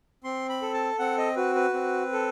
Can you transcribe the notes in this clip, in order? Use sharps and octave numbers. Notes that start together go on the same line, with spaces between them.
C4 C6
B5
A4
A5
C4 F#5
D#5
F#4 B4
B4
C4
A4